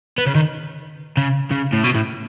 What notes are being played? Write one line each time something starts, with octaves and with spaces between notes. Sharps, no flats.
B3
C#3
D#3
C#3
C#3
A2
B2
A2